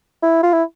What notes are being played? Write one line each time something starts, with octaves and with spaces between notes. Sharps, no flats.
E4
F4
E4